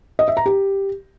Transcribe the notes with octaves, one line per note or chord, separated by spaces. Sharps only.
D#5
E5
A#5
G4